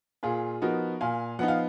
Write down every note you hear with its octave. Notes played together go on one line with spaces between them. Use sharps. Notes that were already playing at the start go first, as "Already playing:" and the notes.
A#2 F4 G#4
F3 B3 D#4 F#4 A#4
A#2 F5 G#5
F3 B3 D#4 F#5
F5